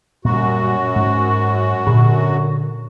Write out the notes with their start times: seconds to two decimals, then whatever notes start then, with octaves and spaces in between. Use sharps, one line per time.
0.25 F#2 A#2 G3 F#4
0.96 G#2
1.87 A#2 D3